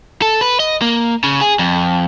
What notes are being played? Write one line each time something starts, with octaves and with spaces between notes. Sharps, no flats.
A4
B4
D#5
A#3
C#3
G#4
F2